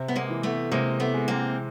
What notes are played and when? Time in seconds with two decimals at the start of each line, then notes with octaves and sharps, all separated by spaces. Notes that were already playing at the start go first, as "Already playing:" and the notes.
Already playing: C3
0.08 B3
0.16 G#3 A#3
0.29 E3
0.43 A3 B3
0.72 C3 G#3 A#3
1.00 A3 B3
1.14 G#3
1.28 A#3 C4